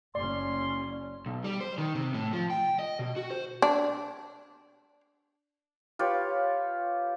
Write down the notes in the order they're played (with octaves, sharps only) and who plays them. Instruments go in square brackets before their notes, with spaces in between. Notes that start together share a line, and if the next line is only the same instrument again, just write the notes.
[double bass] F#1 C#4 [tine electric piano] D5 [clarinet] C6
[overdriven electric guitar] B1
G3
C5
D#3
C3
A2
F3
G5
D#5
B2
F#4
C5
[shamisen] D4
[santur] F4 G4 B4 C#5